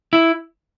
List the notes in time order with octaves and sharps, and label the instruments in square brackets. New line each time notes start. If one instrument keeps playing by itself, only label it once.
[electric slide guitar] E4